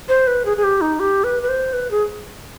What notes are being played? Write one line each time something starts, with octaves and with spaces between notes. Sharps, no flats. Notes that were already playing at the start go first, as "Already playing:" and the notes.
C5
B4
G#4
G#4
G4
D#4
G4
B4
B4
C5
B4
G#4